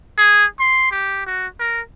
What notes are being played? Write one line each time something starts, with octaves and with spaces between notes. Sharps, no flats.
G#4
C6
G4
F#4
A#4